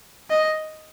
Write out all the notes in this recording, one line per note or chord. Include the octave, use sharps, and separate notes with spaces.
D#5